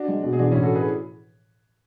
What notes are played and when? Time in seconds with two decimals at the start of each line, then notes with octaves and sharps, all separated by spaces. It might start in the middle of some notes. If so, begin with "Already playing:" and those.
Already playing: D4 F#4
0.08 G#3
0.24 B2
0.33 G#4
0.39 E3 D4 F#4
0.51 C#4 E4
0.56 A2
0.63 F#4 A4
0.75 G#4 B4